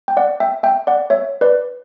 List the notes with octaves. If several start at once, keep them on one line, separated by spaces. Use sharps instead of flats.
G5
D5 F#5
E5 G5
E5 G5
D5 F#5
C#5 E5
B4 D5